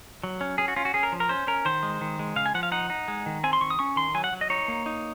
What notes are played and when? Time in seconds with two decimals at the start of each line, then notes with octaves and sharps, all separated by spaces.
0.24 F#3
0.41 C#4
0.58 C#4 G#4
0.68 F#4
0.76 C#4 F4
0.85 F#4
0.94 C#4 G#4
1.03 A#4
1.12 F3
1.20 A#4
1.29 C#4 C5
1.47 C#4 A#4
1.65 D#3 C5
1.83 G#3
2.01 D#3
2.19 G#3
2.36 C#3 F5
2.46 G#5
2.54 F3 F#5
2.63 F5
2.72 D#4 F#5
2.90 D#4
3.08 G#3
3.26 D#3
3.44 C4 G#5
3.53 C6
3.61 D#3 C#6
3.70 D#6
3.79 C#4 C#6
3.96 D#3 C6
4.14 F#3 G#5
4.24 F#5
4.33 F#3
4.41 D#5
4.50 D#4 C#5
4.68 A#3
4.86 D#4